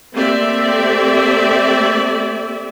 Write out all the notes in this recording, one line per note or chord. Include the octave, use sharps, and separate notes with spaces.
A3 A#3 C4 G4 D5 E5